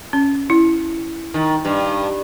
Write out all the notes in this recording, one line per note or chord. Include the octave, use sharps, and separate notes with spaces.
C#4
E4
D#3
G2